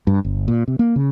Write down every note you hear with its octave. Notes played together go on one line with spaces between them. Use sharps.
G2
G1
A#2
C3
A#3
C#3